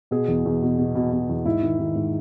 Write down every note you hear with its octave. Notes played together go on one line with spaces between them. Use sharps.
B2 G#4
E2
E2
B2
B2
B2
B2
E2
G#2 E4
D#3
D#3
G#2